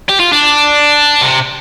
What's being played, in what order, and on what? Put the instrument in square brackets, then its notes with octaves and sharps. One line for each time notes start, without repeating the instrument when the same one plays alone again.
[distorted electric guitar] G4
F4
D4
C3